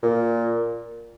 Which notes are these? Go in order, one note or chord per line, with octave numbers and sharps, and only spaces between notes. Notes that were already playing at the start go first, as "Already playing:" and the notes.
A#2